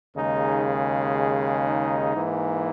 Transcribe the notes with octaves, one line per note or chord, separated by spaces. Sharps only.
D#2 C#3 G#3 D#4
D#4
G#2 E3 A#3